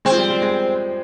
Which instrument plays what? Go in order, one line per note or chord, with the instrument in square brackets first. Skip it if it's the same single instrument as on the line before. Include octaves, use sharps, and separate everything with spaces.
[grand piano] G#3 [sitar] C4
[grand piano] F3
G3
G3
G#3